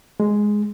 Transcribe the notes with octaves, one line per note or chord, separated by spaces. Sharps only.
G#3